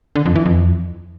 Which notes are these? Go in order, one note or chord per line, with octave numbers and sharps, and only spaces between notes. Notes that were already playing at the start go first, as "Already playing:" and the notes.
D3
F2
E3
F2